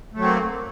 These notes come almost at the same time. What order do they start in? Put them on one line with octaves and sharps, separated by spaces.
A3 F#3 C4 A#3